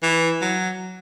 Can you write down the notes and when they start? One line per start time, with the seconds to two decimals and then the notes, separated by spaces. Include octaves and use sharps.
0.03 E3
0.42 F#3